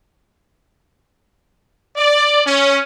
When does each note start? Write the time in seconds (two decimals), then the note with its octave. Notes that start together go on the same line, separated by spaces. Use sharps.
1.97 D5
2.45 C#4